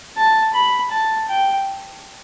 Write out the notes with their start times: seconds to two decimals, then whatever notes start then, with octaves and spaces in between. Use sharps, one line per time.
0.17 A5
0.54 B5
0.91 A5
1.29 G5